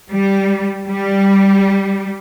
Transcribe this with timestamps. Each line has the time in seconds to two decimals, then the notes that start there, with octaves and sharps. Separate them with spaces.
0.11 G3
0.86 G3